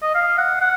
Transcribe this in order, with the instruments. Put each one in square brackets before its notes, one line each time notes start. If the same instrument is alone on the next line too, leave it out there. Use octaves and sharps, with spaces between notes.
[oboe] D#5
F5
F#5
F#5